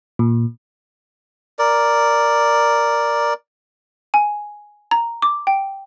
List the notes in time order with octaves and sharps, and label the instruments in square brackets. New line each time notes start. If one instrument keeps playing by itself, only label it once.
[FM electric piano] A#2
[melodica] A#4 D5
[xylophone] G#5
A#5
D6
G5